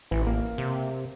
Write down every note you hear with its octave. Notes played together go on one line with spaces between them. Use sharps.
A1 E3
A#3
C3